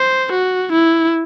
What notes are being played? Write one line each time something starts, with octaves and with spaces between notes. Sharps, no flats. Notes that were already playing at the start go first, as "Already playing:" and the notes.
Already playing: C5
F#4
E4